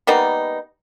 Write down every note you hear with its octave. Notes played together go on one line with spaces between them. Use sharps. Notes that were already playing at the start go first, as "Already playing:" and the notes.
G3 A#3 B3 D#4